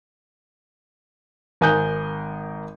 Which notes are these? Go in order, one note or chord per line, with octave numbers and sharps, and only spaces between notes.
G#1 A#4 G#5 D#6 F#6 G6